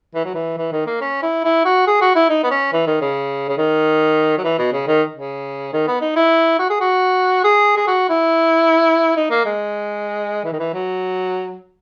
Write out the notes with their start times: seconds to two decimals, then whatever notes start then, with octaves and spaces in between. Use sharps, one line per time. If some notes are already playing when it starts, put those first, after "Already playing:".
0.15 E3
0.25 F#3
0.34 E3
0.57 E3
0.72 D#3
0.86 A#3
1.01 C#4
1.22 E4
1.44 E4
1.65 F#4
1.87 G#4
2.01 F#4
2.15 E4
2.29 D#4
2.44 B3
2.51 C#4
2.73 E3
2.87 D#3
3.01 C#3
3.48 C#3
3.58 D#3
4.38 F#3
4.44 E3
4.58 B2
4.73 C#3
4.87 D#3
5.16 C#3
5.73 D#3
5.87 B3
6.01 D#4
6.16 E4
6.59 F#4
6.70 G#4
6.80 F#4
7.44 G#4
7.76 G#4
7.87 F#4
8.09 E4
9.16 D#4
9.31 A#3
9.45 G#3
10.45 E3
10.52 D#3
10.59 E3
10.74 F#3